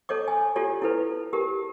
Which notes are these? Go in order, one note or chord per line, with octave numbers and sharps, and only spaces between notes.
A4 C#5 D#5 D6
G#5
F4 G4 A4 C#5 D5
E4 A4 B4
G4 A#4